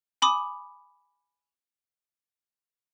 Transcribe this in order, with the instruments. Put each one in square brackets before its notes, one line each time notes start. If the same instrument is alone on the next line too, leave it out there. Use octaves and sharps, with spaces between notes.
[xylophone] G#5 B5 D6 D#6